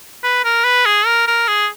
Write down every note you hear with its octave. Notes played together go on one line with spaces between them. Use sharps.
B4
A#4
B4
G#4
A#4
A#4
G#4